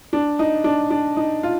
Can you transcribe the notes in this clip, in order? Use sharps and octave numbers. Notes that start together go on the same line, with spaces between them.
D4
D#4
D4
D4
D#4
F4